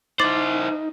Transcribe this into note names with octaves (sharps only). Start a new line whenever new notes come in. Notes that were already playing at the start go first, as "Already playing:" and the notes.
D#4 E4 C5 D6 A6 F#7